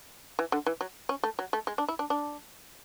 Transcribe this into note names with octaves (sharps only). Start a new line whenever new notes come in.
E3
D3
E3
F#3
C#4
A3
F#3
A3
G#3
D4
E4
D4
D4